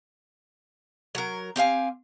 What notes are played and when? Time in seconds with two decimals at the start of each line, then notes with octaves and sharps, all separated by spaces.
1.15 F#3 A#4
1.56 C4 G4 F5 G#5